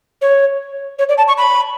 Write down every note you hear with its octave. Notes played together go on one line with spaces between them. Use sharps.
C#5
C#5
D5
A5
C#6
B5